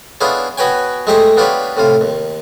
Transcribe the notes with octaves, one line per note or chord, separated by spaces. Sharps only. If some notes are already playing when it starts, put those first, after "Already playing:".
B3 D4 E4 F4 G#4 C#5
B3 F#4 B4 C#5 G5 G#5
G#3 A3 D#4 G4 G#4 C5
B3 D4 F4 G4 B4 C#5
A2 C3 F4
D#2